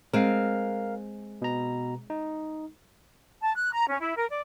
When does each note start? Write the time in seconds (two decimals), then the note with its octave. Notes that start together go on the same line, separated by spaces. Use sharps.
0.13 G#3 C4 A#4 F5
1.42 B2 A#5
2.10 D#4
3.41 A5
3.54 F#6
3.71 A#5
3.88 C#4
4.00 E4
4.15 A#4
4.28 D5